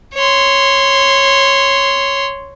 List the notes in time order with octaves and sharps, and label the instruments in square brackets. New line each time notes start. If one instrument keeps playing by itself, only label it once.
[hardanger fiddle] C#5 C6